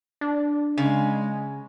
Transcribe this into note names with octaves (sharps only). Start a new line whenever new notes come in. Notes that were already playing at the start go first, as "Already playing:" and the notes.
D4
C#3 G#3